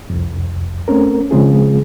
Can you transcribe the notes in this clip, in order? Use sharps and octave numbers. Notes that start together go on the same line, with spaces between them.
C2 F2
A3 C4 C#4 A#4
C#3 F3 G#3 C4 F4 G#4